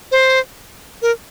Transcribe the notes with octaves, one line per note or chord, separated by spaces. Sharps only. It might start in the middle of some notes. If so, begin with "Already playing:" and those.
C5
A#4